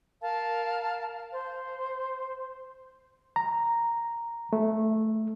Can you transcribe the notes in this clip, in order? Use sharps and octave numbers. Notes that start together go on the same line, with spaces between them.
A#4 F5 A5
C5
A#5
A3